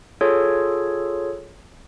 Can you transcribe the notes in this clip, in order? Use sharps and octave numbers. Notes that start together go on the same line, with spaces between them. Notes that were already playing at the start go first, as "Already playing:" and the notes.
F4 G#4 A4 C#5